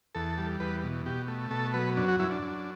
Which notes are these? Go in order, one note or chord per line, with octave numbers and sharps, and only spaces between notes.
E2 A4
G3
E2 B4
B2
B2 G4
A3
B2 A4
F#3 B4
F#2 D4
F#4
F#2 E4
D4
F#2